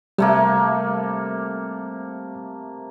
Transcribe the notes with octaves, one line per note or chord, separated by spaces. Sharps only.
C3 G3 A3 A#3